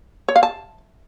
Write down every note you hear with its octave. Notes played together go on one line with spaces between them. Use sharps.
C#5
F5
A5